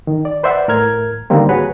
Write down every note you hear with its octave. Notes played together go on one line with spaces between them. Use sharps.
D#3
D5
B4 C5 D5 E5 F#5
A2 A#4 F6 G#6
D3 D#3 G3 A#3 C4
F#4 G#4 B4 C#5